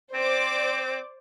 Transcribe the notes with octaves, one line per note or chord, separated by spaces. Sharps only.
C4 C5 D5 D6